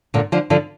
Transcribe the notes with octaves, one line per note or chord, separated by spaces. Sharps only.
A#2 D3
D3 F3
D3 F3